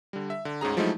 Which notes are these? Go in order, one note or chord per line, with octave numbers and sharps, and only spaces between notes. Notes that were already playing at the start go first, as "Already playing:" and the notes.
D3 G3
E5
D3
D2 G#2 C#4 G#4 A#5
F3 F#3 G#3 A3 D#4 E4